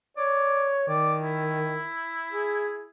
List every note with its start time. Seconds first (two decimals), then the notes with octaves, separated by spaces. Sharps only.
0.17 C#5 D5
0.88 D#3 D5
1.22 E4
2.32 G#4